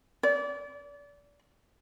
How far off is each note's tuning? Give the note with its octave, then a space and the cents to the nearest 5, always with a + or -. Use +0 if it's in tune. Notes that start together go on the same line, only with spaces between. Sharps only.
D5 -30